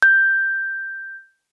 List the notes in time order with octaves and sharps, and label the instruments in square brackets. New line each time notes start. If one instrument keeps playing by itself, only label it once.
[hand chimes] G6